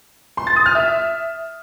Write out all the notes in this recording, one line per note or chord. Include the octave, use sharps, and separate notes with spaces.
C6
A6
D#6
F6
E5